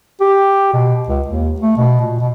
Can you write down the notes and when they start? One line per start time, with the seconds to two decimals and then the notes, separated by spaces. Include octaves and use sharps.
0.21 G4
0.73 B2
1.08 C#2
1.27 D#2
1.60 A3
1.77 B2
2.01 A#2
2.20 B2